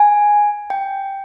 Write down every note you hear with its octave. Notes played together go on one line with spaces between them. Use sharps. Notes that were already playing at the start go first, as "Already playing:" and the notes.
Already playing: G#5
G5